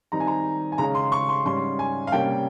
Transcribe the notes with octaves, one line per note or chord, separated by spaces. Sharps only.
D#3 G3 C4 D#4 A#5
G#5
A#5
G#5
C#3 G#3 C#4 A#5
C6
C#6
C6
G#2 G3 C#4 C6
G#5
F5
C3 G3 A#3 C#4 G5